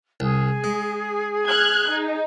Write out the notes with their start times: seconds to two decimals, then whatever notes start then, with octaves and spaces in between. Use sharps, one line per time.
0.20 C2 G#4
0.64 G#3
1.48 F6 F#6 G#6
1.89 D#4